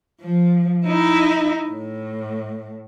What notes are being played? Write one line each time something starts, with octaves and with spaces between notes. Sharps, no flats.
F3
D#4 E4
A2